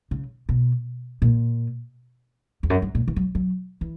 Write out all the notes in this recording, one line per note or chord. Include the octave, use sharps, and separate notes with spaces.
C#3
B2
A#2
E2
F#2
G2
A#2
E3
F#3
F#3
E3